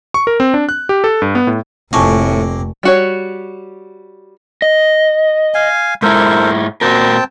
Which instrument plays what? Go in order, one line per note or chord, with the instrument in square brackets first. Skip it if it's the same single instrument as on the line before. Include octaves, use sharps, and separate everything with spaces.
[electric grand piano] C#6
A#4
C4
D4
F#6
G4
A4
G2
B3
A2
[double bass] F1 [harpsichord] F2 A#3 [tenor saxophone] A2 [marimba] G#5 A5 C#6
[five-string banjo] G3 F#4 C#5
[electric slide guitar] D#5
[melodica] F5 G#5
[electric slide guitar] G#2 G#3 E4 [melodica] A4 A#4 C5
[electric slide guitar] A#2 F#4 A#4 [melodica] C4 G5 A5